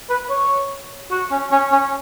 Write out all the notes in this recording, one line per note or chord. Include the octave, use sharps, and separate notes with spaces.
B4
C#5
F#4
C#4
C#4
C#4